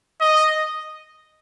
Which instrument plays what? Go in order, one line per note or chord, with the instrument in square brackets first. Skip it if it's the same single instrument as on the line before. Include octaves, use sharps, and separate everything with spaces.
[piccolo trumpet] D#5